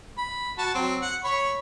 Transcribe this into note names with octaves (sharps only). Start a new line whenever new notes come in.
B5
F#4 A5
F#3 C4
F#5
C#5 B5 C#6